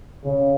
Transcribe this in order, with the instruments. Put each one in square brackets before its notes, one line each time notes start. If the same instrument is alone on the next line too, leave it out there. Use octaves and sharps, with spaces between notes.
[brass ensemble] C#3